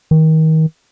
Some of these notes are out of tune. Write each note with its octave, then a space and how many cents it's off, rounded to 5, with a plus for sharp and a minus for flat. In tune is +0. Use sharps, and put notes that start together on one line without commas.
D#3 +30